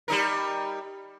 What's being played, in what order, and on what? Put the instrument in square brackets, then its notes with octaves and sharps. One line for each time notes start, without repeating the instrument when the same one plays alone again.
[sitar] G3 D#4 A#4